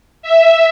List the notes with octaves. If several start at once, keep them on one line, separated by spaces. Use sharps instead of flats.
E5